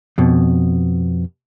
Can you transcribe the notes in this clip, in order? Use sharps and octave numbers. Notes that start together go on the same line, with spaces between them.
F2 B2